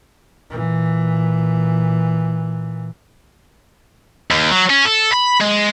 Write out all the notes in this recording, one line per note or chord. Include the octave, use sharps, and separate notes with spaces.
A#2 E3
D#2
F#3
C#4
A4
B5
G#3